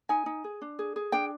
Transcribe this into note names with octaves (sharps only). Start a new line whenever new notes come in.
D#4 G#5
D#4
G#4
D4
G#4
G#4
D4 G5